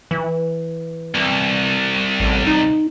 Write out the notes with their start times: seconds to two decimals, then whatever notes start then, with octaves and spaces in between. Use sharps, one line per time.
0.11 E3
1.14 C2
2.20 A1
2.47 D#4